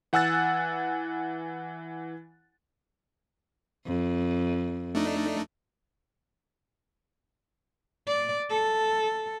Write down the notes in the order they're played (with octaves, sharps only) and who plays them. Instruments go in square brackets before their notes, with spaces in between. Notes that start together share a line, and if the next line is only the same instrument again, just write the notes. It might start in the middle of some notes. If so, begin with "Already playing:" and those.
[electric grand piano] E3 F#5 G#5 E6 F#6 A6
[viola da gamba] F2
[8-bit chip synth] A3 D4 D#4
[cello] D5
A4